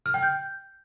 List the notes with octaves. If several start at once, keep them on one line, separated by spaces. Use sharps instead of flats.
F6
G5
G6